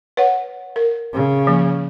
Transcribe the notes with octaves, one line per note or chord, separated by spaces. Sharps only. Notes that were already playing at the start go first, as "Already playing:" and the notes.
B4 C#5 F#5
A#4
C#3
F3 A#3